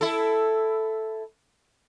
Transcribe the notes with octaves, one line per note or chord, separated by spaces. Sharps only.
E4 A4